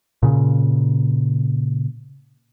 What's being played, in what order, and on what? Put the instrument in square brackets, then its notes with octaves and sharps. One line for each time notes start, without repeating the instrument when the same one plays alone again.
[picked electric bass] A#2 C#3